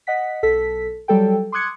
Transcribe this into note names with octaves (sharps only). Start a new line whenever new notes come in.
D#5 F#5 B6
B1 A4 B6
F#3 G3 A4 G5
C6 D6 D#6 F#6 G#6 C#7